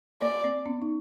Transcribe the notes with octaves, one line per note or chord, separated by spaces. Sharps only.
A#3 D5
A#3 C4
B3 C#4
D#4